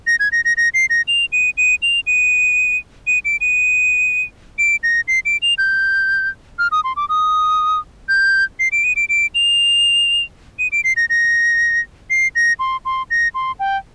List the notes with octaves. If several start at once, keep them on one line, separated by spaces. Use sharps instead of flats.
A#6
G#6
A#6
A#6
A#6
C7
A#6
F7
D#7
D#7
F7
D#7
D#7
D7
D#7
D7
A#6
C7
D7
F7
G6
F6
D#6
C6
D6
D#6
G6
C7
D7
D#7
D7
D7
F7
D#7
D7
C7
A#6
A#6
C7
A#6
C6
C6
A#6
C6
G5